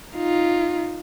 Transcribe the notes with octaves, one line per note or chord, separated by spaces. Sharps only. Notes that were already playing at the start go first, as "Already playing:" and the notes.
D#4 F4